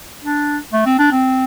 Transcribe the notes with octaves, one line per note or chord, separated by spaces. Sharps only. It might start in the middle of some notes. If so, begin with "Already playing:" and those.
D4
A3
C4
D4
C4